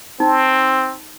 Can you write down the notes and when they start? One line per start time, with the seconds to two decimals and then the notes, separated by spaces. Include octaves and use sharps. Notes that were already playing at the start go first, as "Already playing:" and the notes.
0.20 C4 D#4